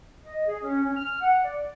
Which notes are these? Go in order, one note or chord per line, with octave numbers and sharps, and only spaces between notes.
D#5
G#4
C#4
C#4
F6
F#5
D5